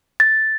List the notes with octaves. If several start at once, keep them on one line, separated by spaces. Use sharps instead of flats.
A6